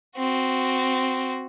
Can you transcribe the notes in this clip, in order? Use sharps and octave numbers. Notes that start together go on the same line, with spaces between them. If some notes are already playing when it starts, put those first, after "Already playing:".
C4 F#4